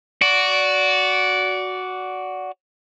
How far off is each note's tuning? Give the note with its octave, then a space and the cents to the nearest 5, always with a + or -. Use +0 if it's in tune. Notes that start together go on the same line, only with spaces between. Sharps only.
F#4 +0 D5 -20